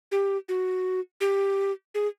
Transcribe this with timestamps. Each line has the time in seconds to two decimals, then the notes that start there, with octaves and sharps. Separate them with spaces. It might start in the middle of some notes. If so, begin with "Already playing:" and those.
0.12 G4
0.49 F#4
1.21 G4
1.95 G#4